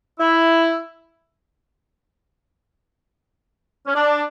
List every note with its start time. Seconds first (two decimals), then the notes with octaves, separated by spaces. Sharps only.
0.20 E4
3.87 C#4
3.95 D4